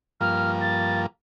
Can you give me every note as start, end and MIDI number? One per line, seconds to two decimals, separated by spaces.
0.21 1.06 43
0.21 1.06 53
0.21 1.06 58
0.21 0.51 89
0.61 1.01 93